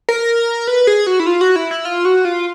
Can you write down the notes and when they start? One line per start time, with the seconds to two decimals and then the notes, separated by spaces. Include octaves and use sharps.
0.09 A#4
0.67 B4
0.87 G#4
1.07 F#4
1.20 E4
1.26 F4
1.41 F#4
1.56 E4
1.71 E4
1.85 F4
2.05 F#4
2.25 F4